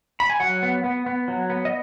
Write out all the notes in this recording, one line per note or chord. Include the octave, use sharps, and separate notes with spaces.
B5
G#5
F#3 F#5
B3
B3
B3
F#3
B3
D#5